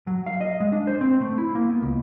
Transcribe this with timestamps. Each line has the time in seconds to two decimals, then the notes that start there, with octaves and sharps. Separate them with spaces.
0.07 F#3
0.26 F5
0.41 D#5
0.60 G#3
0.72 D4
0.87 C5
1.01 C4
1.21 A3
1.38 E4
1.55 A#3
1.69 B3
1.83 C#2